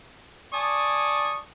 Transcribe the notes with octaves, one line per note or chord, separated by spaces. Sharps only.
D5 G#5 A5 C#6 D#6